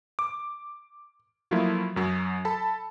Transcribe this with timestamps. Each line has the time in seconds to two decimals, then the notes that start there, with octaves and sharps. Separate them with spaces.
0.19 D6
1.51 F3 F#3 A3 A#3 E4 F4
1.96 F#2 F#3
2.45 A4 A5 B5